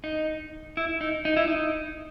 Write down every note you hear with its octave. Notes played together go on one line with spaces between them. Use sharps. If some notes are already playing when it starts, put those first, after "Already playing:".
D#4
E4
D#4
D#4
E4
D#4